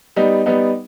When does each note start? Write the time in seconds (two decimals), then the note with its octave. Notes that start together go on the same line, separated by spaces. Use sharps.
0.16 G3 B3 D#4
0.46 G3 B3 D#4